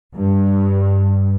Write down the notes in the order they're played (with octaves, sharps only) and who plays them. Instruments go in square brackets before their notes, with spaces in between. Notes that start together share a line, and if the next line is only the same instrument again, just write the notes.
[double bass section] G2